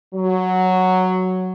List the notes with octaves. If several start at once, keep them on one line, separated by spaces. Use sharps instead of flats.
F#3